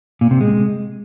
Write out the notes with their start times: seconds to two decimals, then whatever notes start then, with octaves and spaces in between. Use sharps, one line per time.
0.21 A#2
0.31 C3
0.41 G#3